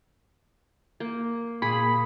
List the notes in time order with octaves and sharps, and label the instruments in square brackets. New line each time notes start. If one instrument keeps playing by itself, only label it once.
[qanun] A#3
[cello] A#2 [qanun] G#4 [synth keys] B5